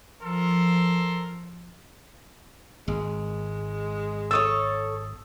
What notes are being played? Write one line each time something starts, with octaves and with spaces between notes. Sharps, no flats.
F3 A4 A#4 C6
G#1 G#3
A4 C5 C#5 D#6 E6